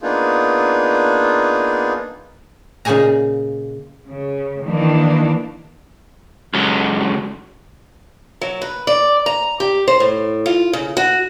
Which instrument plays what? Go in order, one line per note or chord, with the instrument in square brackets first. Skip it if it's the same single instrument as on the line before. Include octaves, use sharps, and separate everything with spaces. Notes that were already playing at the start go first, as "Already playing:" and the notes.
[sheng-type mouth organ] A#3 B3 D4 D#4 F4 G#4
[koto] A#2 C#3 D#4 G#4 G#5 A#5
[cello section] C#3
D#3 E3 A#3 D4
[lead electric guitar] C#2 F#3
[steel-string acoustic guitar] F#3
B4
D5
A#5
G4
C5
A2
F4
C#3
F#4